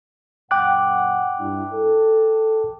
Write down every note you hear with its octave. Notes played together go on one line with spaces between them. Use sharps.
F#2 A#2 F#5 G5 D6 F#6
G2 D4 E4
A4